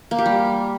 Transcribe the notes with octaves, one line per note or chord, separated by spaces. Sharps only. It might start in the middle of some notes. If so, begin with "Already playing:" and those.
A#3
G4
G3